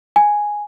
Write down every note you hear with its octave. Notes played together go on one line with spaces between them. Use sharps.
G#5